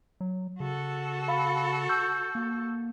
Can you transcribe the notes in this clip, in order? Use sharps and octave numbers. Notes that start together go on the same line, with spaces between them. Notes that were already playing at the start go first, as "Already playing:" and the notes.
F#3
C#3 F#4 A4
F5 B5
C#6 E6 G6
A#3